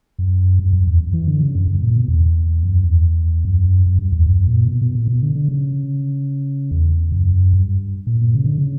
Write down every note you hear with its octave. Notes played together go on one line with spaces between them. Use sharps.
F#2
G2
F#2
E2
F#2
E3
D3
C#3
F#2
G2
A#2
B2
E2
F#2
E2
F#2
F#2
G2
E2
F#2
A#2
B2
B2
A#2
B2
D3
D3
C#3
E2
F#2
G2
A#2
A#2
C#3
D3
C#3